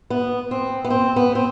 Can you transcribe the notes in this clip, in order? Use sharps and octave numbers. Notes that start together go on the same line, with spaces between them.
B3
C4
B3
C4
B3
C4